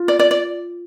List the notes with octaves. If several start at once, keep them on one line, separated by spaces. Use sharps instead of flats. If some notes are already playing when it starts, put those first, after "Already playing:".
Already playing: F4
D5
D5
D5